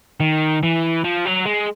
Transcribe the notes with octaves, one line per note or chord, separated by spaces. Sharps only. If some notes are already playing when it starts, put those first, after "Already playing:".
D#3
E3
F3
F#3
G#3